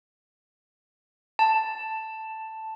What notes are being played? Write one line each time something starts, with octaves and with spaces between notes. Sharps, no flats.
A5